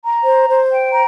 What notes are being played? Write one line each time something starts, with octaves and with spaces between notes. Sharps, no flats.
A#5
C5
C5
G5
A#5